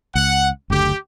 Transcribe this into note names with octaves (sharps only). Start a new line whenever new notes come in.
C#2 F#5
F#1 D2 D3 G4